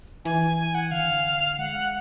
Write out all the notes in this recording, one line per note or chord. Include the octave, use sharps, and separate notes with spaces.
E3 G#5
G#5
F#5
D3 F5
G#3 F#5